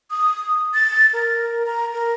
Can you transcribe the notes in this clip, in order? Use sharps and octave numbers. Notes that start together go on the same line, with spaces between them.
D#6
A6
A#4
A#5
A#4